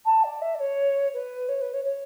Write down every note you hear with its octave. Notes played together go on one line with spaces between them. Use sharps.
A5
D5
E5
D5
C#5
B4
C#5
B4
C#5
C#5